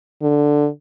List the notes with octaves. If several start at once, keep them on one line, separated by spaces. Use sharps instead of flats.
D3